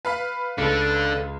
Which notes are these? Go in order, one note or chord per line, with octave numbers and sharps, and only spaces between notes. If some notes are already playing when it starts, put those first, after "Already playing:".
B4 F5 B5
C#2 D3 A4